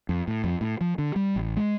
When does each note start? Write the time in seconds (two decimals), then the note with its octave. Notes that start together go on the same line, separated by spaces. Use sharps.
0.09 F2
0.28 A2
0.44 F2
0.61 A2
0.81 F3
0.98 D3
1.16 G3
1.36 A1
1.57 G#3